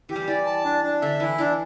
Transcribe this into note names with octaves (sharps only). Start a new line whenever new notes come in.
E3 G4
G3
E3 D5
A5
D4
D4
D3 E5
E3 E4
E3 D4